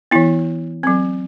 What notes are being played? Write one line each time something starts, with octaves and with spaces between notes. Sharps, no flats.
E3 B3 E4
F#3 C4